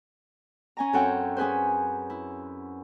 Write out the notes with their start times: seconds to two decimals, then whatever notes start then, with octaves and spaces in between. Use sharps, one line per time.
0.77 C#4 G#5 A#5
0.93 F#2 C4 A4 C#5 F#5 G5
1.37 C#4 G#4 B4 C5
2.10 E4